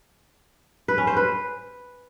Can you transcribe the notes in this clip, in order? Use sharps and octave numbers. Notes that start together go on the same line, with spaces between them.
B4
C#4
C5
B4